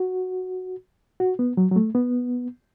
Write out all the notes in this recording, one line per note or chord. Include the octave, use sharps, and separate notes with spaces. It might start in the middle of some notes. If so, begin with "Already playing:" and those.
Already playing: F#4
F#4
B3
F#3
F#3
A3
B3